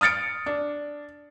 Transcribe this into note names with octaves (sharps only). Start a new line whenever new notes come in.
D#6 F6 A6 C#7 D7
D4